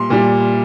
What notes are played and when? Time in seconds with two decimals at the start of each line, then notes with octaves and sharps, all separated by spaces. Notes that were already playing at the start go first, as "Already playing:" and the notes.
Already playing: A#2 G3 C6
0.10 A#2 G3